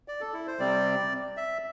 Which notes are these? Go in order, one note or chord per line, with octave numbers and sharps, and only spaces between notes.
D5
A4
E4
C5
C3 G3 C4 D5
E5